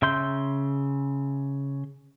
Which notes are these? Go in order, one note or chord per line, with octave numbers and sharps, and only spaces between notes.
C#3 E5 C6 G6